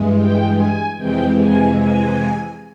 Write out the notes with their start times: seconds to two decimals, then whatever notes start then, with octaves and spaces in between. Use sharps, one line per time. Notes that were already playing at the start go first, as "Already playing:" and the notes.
Already playing: G2 E3 G#3
0.17 G5
0.56 G#5
0.97 F2 C3 E3 G#3 G5
1.38 G#5
1.78 G#5